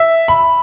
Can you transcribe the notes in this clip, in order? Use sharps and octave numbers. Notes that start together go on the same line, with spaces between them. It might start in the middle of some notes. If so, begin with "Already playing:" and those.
Already playing: E5
B5